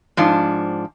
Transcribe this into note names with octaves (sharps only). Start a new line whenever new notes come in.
G#2 F3 D4